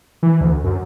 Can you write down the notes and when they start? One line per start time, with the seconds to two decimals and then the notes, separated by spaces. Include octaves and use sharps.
0.23 E3
0.41 D2
0.64 F#2